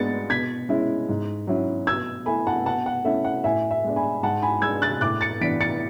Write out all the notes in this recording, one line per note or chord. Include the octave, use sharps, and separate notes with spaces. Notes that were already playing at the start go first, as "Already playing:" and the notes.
Already playing: G#2 G#3 B3 D4 A6 C#7
B2 G#6 B6
G#3 C#4 E4
G#2
F#3 C#4 E4
B2 E6 G#6
A3 E4 G#5 B5
F#5 A5
B2 F#5 A5
F#5
A3 C#4 E4 E5
F#5
A2 E5 G#5
E5
G#3 B3 D4
G#5 B5
G#2 F#5 A5
G#5 B5
G#3 D4 E6 G#6
F#6 A6
A2 D6 F#6
A6 C#7
E3 B3 D4 B6 D7
A6 C#7